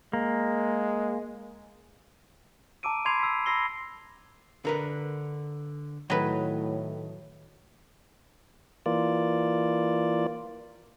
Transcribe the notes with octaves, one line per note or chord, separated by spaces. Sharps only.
G#3 A#3
A5 A#5 D6 E6 D7 D#7
B5 C6 D6 G#6 C7 F7
E6 B6
B5 C6 E6 A#6 C7 G7
D3 A#4 B4
A2 D#3 F#3 B4
E3 A#3 F4 D5